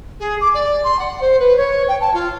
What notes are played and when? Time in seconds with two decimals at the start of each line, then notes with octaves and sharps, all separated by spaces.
0.19 G#4
0.40 D6
0.54 D5
0.83 C6
0.99 F#5
1.20 C5
1.39 B4
1.56 C#5
1.88 G5
2.00 A5
2.13 F4